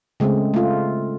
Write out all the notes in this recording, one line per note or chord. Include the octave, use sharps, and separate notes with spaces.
C#3 G#3 A3 C4
A3 F4